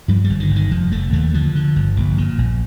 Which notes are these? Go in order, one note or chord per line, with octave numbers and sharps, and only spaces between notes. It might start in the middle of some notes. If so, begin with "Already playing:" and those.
G2 F3
G3
G1
D#3
G1
D#3
F1 F3
F1 A3
D#2 A3
D3 F3
D3
G1
A#1
A#2
A#1